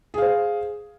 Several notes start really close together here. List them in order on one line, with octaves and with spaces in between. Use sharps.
G#4 F5 C5